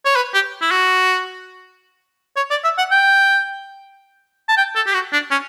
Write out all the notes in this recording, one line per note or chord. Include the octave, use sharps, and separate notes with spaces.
C#5
B4
G4
E4
F#4
C#5
D5
E5
F#5
G5
A5
G5
A4
G4
F#4
D4
C#4